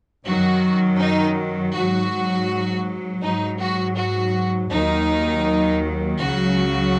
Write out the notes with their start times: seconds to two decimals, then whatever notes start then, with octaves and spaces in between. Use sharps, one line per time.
0.24 F#2 D#3 F#3 F#4
0.98 D#4
1.73 G#2 F#3 F#4
3.21 G#2 F#3 D#4
3.59 F#4
3.96 F#4
4.70 D#2 D#3 F#3 D#4
6.19 C#2 C#3 F#3 F#4